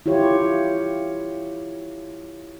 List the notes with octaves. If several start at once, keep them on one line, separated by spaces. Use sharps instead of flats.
E4 F4 G4 C#5